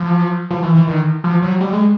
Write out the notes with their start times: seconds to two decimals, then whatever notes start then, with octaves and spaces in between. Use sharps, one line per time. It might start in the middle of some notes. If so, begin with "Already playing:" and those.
Already playing: F3
0.50 F3
0.63 E3
0.75 E3
0.87 D#3
1.24 F3
1.42 F#3
1.61 G3
1.73 G#3